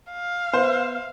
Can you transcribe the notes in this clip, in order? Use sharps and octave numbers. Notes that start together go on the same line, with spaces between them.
F5
B3 B4 C5 E5